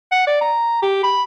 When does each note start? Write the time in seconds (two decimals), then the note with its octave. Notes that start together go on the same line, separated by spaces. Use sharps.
0.12 F#5
0.27 D5
0.41 A#5
0.82 G4
1.03 B5